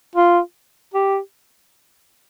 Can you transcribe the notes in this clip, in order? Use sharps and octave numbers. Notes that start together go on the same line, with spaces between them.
F4
G4